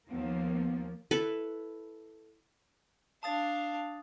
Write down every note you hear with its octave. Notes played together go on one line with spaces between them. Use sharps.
D#2 F3 A#3 B3
E4 A4 B4
D4 F5 A5 D#6 A6